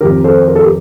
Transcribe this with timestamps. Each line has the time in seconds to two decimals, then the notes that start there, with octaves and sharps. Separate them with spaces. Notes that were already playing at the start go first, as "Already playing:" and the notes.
0.01 F2 D#3 G4 A#4
0.24 A4 C5
0.48 A#4
0.55 A4
0.63 G4 A#4